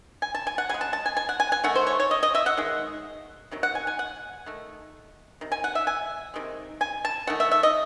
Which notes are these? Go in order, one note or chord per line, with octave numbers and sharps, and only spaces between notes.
G#5
A5
G#5
F#5
C#3 G#3 G#5
A5
A5
G#5
G#5
F#5
G#5
G#5
D#3 A3 F#5
C5
C#5
C#5
D#5
D#5
E5
F#5
D#3 G#3
C3 D#3 F#3
F#5
G#5
G#5
F#5
D#3 A3
C3 D#3
G#5
F#5
E5
G#5
C3 D#3 G#3
G#5
A5
D#3 A3 F#5
E5
E5
D#5